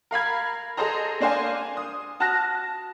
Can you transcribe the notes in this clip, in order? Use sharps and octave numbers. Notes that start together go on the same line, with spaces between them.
A#4 F5 B5 G#6
G#4 A4 C5 D#5 A#5
A#3 D4 C5 F5 G#5
D#6
F#4 A5 F6 F#6 A#6